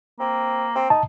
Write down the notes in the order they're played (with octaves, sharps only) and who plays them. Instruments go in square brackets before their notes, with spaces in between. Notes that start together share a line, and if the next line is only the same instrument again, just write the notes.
[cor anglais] A#3 [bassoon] C4
[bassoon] C4
[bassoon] D#4 [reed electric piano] A5